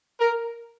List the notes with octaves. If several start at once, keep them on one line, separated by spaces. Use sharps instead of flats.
A#4